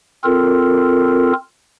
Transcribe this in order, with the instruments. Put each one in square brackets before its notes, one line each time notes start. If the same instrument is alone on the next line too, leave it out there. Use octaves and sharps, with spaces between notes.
[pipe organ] C4 F4 A4 A#4